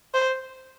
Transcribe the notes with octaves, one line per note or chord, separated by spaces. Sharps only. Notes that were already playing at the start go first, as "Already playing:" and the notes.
C5